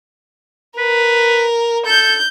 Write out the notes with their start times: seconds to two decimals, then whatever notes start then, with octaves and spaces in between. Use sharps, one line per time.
0.78 A#4 B4
1.86 A4 G6